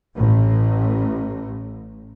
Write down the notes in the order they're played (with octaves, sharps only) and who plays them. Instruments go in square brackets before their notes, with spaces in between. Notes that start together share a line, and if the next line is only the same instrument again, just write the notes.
[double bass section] A1 A2